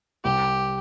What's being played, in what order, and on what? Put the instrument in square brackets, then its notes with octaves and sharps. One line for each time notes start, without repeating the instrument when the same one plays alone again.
[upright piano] C2 [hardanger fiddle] G4